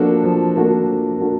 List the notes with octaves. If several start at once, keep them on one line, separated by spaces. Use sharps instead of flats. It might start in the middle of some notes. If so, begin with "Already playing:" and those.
Already playing: F3 A#3 D4 F#4 A4
F3
A#3 D4 F#4 A4
F3
A#3 D4 F#4 A4